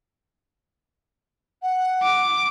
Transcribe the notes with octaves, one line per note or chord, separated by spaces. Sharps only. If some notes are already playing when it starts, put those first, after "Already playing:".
F#5
D6